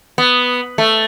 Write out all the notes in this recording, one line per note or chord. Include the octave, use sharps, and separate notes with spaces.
B3
A3